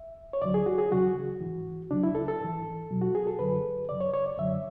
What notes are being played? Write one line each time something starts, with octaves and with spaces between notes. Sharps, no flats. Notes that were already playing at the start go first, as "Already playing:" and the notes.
Already playing: E5
C#5
D2 D3 F#3 D5
G#4
F#4
G#4
E2 C#3 F#3 F#4
G#2 E3
C#2 C#3 F#3 D4
E4
A4
A4
G#2 E3
E2 B2 F#3
F#4
G#4
A4
F#2 D3 F#3 B4
F#2 C#3 F#3 D5
C#5
C#5
D5
F#2 D3 F#3 E5